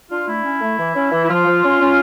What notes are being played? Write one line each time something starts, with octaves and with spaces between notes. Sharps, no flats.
D4 F4
A3 E4
C#4
A3
E3
C#4
E3
E4
F3 F4
F3
C#4
C#4